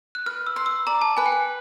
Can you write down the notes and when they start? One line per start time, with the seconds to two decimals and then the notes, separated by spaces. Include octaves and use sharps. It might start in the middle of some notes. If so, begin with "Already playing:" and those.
0.15 F#6
0.26 B4 F6
0.47 E6
0.56 C6
0.66 E6
0.87 D5 A#5
1.02 A5
1.17 B4 G#5
1.26 G5
1.32 G#5